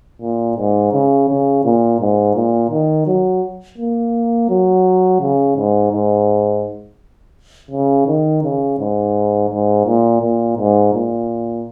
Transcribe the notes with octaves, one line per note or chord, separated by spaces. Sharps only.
A#2
G#2
C#3
C#3
A#2
G#2
A#2
D#3
F#3
A#3
F#3
C#3
G#2
G#2
C#3
D#3
C#3
G#2
G#2
A#2
A#2
G#2
A#2